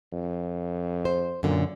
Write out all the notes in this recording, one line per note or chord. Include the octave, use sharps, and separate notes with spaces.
F2
C5
F#2 A#2 D3